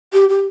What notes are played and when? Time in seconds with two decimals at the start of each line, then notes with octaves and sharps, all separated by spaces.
0.13 G4
0.29 G4